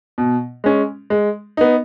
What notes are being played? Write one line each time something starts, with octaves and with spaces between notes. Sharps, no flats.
B2
G#3 C#4
G#3
B3 D#4